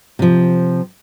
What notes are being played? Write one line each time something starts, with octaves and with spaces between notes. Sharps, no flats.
C3 F3